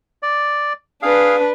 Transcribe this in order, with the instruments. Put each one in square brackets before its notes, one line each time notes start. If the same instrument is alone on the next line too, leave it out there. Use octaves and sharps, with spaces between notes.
[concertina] D5
[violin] D4 B4 [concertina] G#4 F5